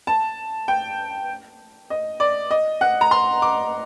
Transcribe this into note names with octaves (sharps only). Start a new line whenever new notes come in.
A5
G5
D#5
D5
D#5
F#5
A#5
C6
D6